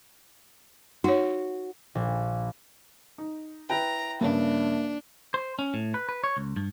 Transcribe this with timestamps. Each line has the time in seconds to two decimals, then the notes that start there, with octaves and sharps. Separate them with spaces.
1.04 D#4 F#4 C#5
1.95 A#1
3.18 D#4
3.70 E4 B4 G5 A#5
4.21 G2 C#3 A#3 D4
5.34 C5
5.59 C#4
5.74 A2
5.94 B4
6.09 B4
6.24 C#5
6.37 C#2
6.56 G2